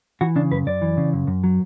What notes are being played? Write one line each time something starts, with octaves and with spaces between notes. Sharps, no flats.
E3 F#4
C#3 D4
F#2 B4
F#2 D5
E3
C#3
F#2
F#2
F#3